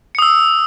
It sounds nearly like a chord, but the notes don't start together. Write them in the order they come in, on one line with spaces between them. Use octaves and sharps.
C#7 D#6 E6